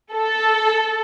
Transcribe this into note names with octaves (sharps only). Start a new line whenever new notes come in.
A4